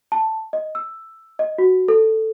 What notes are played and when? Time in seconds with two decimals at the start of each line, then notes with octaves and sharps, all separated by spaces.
0.12 A5
0.53 D#5
0.75 E6
1.39 D#5
1.58 F#4
1.88 A4